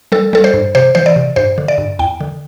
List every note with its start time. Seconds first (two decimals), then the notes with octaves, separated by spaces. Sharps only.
0.12 G3 A4
0.33 G3 A4
0.44 C5
0.54 G2
0.75 C3 C5
0.95 E3 C5
1.06 D5
1.16 C3
1.36 G2 C5
1.58 D3
1.68 D5
1.78 G2
1.99 E2 G5
2.21 D3